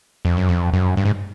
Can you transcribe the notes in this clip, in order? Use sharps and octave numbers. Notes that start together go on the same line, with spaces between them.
F2
F#2
F2
F#2
G2
G#2